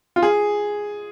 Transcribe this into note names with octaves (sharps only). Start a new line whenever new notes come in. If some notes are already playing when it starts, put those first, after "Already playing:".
F4
G#4